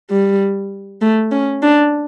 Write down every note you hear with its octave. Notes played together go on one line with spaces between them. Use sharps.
G3
A3
C#4
D4